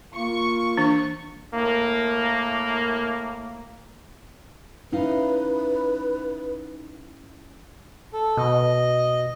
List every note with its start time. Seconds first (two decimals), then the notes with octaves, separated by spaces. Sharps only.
0.15 A#3 F4 C#6
0.77 E3 D4
1.54 A2 A#3
4.92 C#4 D#4 E4 B4 F5
8.13 A4
8.37 B2 D#5